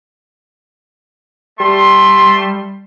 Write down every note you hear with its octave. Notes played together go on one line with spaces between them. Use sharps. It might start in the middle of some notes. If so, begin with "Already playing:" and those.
G3 A3 C6